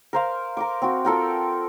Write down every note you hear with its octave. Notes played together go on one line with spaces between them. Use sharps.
A#4 C5 F5
A#4 C6 D6
C4 F#4
F4 A4 A#4 G5